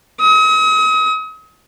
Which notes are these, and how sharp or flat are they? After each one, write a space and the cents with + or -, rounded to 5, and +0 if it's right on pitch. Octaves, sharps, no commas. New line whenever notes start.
D#6 +40